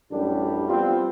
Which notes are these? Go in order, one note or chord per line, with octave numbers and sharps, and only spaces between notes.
A1 F#2 G3 D4
G3 B3 C4 F4